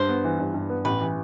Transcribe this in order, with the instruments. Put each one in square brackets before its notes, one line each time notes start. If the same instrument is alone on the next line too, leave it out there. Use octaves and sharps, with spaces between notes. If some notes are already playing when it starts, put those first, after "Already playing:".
Already playing: [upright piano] G2 [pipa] C5
[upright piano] B3
E3
G2
G2
B3
[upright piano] A1 [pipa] B4
[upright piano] E3